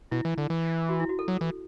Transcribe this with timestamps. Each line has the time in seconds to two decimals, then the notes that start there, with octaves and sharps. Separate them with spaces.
0.11 B2 E4
0.25 E3
0.38 D3
0.50 E3
0.89 F#4
1.00 E4
1.09 F#4
1.19 A4
1.28 F#3
1.41 E3